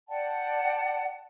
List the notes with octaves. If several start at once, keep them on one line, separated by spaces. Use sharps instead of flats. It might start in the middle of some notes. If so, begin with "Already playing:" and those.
D5 F#5 G5 A5